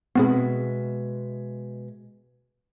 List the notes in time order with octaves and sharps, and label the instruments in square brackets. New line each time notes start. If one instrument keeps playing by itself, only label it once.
[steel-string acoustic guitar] B2 G#3 E5 [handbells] B3 C4 G#4